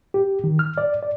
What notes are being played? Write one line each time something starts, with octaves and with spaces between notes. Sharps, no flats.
G4
D#3
F6
D5
D5